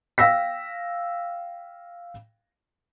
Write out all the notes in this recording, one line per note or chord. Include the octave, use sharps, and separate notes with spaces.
F5 G5 E6 A#6 B6